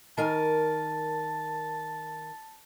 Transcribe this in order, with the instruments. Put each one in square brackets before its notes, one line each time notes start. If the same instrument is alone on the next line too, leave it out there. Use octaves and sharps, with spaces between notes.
[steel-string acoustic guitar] D#3 A#4 G#5 [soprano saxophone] A5